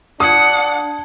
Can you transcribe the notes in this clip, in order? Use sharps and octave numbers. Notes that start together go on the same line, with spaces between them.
D4 F#5 A5 D#6 G#6